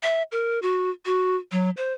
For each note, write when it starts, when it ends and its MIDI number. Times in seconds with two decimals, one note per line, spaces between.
0.03 0.23 76
0.32 0.59 70
0.62 0.90 66
1.06 1.36 66
1.52 1.70 54
1.77 1.93 72